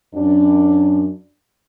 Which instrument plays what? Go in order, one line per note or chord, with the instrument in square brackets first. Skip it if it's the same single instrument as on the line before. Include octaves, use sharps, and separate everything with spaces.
[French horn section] F#2 D4